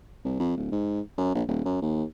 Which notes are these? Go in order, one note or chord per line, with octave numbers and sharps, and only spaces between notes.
C2
F2
D1
G#2
F#2
A#1
D#1
F#2
D#2